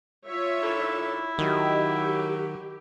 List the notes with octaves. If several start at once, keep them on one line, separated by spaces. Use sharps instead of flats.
F4 C#5 E5
D#3 D4 E4 A4
D#3 F#3 G4